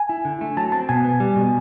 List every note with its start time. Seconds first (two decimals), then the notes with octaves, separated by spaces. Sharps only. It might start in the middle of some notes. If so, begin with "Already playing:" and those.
Already playing: G#5
0.09 E4
0.25 D3
0.41 A3
0.57 F#3 A5
0.72 C4 A5
0.89 B2 G#5
1.04 B3
1.20 G3
1.36 B2